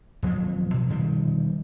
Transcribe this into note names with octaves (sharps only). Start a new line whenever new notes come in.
D#1 F3 F#3 C4
B2
B2 D#3 F3 G3